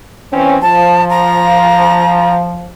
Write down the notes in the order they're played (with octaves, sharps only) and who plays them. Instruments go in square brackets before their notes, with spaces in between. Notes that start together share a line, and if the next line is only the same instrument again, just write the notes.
[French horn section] E3 C4 C#4
[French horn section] F3 [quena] A5
[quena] A#5